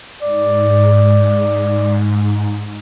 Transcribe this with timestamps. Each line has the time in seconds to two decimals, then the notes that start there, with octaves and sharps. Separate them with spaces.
0.23 G#2 D5